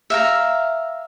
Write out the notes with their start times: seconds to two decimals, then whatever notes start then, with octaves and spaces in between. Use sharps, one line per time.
0.10 E5 F5 A#5